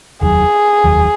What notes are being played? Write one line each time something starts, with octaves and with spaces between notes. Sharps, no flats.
F1 D#2 D#3 F#3 G#4
F1 D#2 D#3 F#3